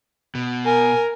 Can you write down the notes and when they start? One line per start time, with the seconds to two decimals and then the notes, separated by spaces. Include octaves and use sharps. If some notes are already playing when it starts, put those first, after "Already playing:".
0.35 B2
0.66 A#4 G#5